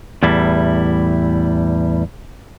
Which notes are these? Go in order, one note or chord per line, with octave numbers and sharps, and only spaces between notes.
E2 A2 G3 E4